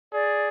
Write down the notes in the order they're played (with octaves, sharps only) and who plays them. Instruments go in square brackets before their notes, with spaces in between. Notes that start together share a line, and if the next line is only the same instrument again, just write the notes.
[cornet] G#4 [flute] D5